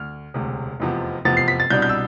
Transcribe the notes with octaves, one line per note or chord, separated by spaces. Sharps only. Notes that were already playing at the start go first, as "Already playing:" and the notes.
Already playing: D2 F6
E1 D2 C3
F1 E2 C3 F3 B3
F1 E2 C3 F3 B3 A6
C7
B6
A6
C2 B2 G3 D4 G6
G6
E6